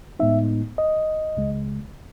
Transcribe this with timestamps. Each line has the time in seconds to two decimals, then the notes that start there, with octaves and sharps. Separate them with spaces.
0.20 A2 G#3 B3 D#4 E5
0.78 D#5
1.37 C#2 C#3 G#3